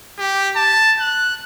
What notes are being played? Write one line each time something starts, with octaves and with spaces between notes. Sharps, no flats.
G4
A5
F#6